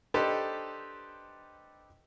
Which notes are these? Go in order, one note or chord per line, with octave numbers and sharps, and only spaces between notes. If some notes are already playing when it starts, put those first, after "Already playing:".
D4 D#4 G4 A4 B4 C5